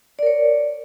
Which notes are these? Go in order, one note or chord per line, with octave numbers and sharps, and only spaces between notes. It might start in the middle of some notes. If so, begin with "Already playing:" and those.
A#4 C#5 D5